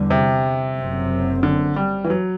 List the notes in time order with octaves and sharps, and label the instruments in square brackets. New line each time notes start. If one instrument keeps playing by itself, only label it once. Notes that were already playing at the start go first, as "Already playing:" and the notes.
Already playing: [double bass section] E2 D3 G3
[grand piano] C3
[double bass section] F#1 F#2 F#3 C4
[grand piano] D3
G3
E3
F#3